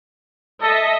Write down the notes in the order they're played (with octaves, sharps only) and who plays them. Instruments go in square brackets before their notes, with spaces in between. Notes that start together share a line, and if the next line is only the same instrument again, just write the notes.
[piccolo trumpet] A4 [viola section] D#5 E5